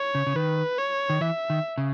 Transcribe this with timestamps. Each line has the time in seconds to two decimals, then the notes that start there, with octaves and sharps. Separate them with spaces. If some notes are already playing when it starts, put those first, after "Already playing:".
Already playing: C#5
0.15 C#3
0.27 C#3
0.36 D#3 B4
0.79 C#5
1.10 D#3
1.21 E3 E5
1.50 D#3
1.78 C#3